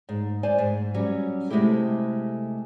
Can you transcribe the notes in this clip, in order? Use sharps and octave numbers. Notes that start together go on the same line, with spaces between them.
G#2
C5 D5 G#5
G#2
F#3 G3 C#4
C3 G#3 A3 E4 G4 A4